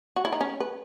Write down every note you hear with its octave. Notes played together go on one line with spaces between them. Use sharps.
F#4
E4
D#4
C#4
B4